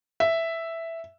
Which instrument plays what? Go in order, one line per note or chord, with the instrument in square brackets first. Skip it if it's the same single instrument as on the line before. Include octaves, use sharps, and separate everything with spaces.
[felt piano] E5